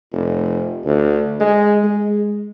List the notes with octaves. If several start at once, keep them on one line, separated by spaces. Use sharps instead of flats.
F1
D2
G#3
G#3